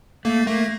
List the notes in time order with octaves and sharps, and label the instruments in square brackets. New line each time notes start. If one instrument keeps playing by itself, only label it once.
[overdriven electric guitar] A3 [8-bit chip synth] A#3
[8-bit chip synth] A3 [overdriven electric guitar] A#3